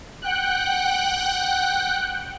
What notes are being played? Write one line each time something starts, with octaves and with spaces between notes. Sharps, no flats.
F#5 G5 F#6